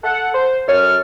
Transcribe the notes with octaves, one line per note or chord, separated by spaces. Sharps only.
A4 F#5
C5
F#2 A4 C#5 F6